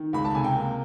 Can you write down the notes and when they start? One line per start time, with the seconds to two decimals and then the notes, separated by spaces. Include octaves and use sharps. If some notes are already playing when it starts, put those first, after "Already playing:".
Already playing: D#3
0.13 C#2 B5
0.25 A5
0.35 C3 G#5
0.44 G5
0.55 A#3